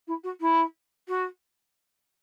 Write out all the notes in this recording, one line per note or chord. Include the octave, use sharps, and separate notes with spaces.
E4
F#4
E4
F#4